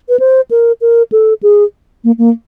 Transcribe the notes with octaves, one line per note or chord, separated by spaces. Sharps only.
B4
C5
A#4
A#4
A4
G#4
A#3
A#3